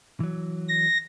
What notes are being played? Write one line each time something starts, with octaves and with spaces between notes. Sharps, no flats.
E3 F#3
A#6